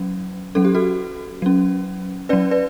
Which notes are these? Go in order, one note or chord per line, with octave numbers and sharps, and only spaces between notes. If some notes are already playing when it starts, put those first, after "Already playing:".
Already playing: F#3 C#4
F#3 C#4 A4
G4
F#4 A4
F#3 C#4
F#3 C#4 B4 D5
B4 D5